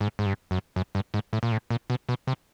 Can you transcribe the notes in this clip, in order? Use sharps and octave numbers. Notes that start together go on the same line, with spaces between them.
G#2
G#2
G2
F#2
F#2
G2
G#2
A2
A#2
A2
A#2
B2
B2
C3